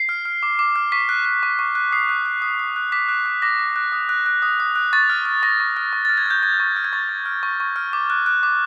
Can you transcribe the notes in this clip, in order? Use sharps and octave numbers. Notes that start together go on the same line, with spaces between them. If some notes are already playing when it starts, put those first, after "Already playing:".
Already playing: C7
F6
F6
D6
D6
F6
C#6 B6
F#6
F#6
C#6
C#6
F#6
D#6 C7
F#6
F#6
D#6
D#6
F#6
D6 B6
F#6
F#6
D6 A#6
D6
F#6
D#6
F#6
F#6
D#6
D#6
F#6
C#6 A6
F6
F6
C#6 A#6
C#6
F6
C#6
F6 A6
G#6
F6 G6
C#6 G#6
C#6
F6
G#6
C#6 A6
F6
F6
C#6
C#6
F6
D6
F#6
F#6
D6